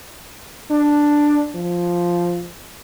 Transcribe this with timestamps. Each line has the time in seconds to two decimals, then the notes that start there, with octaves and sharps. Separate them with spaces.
0.70 D4
1.55 F3